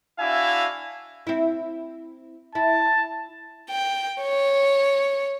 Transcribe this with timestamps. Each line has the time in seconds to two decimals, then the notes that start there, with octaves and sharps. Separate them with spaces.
0.19 D4 E4 F#4 E5 F5 G#5
1.27 C4 E4
2.55 E4 A5
3.70 G5
4.22 C#5